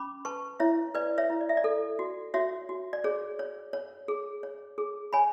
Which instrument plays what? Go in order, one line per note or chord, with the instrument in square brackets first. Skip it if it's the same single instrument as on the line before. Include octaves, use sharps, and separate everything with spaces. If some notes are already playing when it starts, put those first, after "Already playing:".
Already playing: [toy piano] C#4 B5 D6
B4 A5 C#6
E4 C#5 E5
B4 D5
C#5 E5
E4
D5
E5
D5
A4
F#4
F#4 C#5 E5
F#4
D5
G#4 C#5
C#5
C#5
G#4
C#5
G#4
C#5 G#5 B5